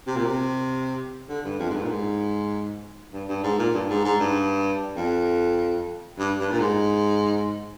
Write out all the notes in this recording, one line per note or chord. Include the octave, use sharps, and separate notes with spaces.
C3
A#2
C3
D3
G2
F2
G#2
G2
A#2
G#2
G2
G2
G#2
A#2
G2
G#2
G#2
G2
F2
G2
G2
A#2
G#2